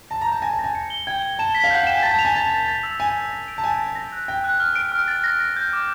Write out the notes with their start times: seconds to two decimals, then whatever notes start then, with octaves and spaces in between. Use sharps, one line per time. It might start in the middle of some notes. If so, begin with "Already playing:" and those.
0.10 A5 A#6
0.21 A#5
0.27 A5 G6
0.42 G#5 A#6
0.53 A5
0.59 A#6
0.64 G#5
0.75 C#7
0.90 G7
1.07 G5 G#6
1.22 G7
1.39 A5 E7
1.55 B6
1.64 F5
1.71 F#5 G6
1.84 G5 E7
1.93 G#5
2.03 A5 A6
2.14 A5
2.19 F7
2.25 G#5
2.35 A5 A6
2.52 A6
2.68 A6
2.83 E6
3.00 G#5 E6
3.16 E6
3.32 A#6
3.48 D7
3.58 A5
3.64 G#5 G6
3.80 A#6
3.95 A#6
4.12 F#6
4.28 G5 A#6
4.44 F#6
4.60 F6
4.76 D7
4.92 F6
5.08 A6
5.24 A#6
5.40 A#6
5.56 G6
5.73 D6